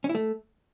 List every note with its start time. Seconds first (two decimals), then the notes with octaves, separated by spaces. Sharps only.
0.04 C#4
0.09 E4
0.15 A3